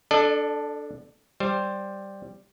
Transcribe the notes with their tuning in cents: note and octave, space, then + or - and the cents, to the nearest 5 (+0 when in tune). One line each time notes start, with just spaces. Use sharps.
D4 +0 A4 +0 D5 +45
G3 +0 C5 +5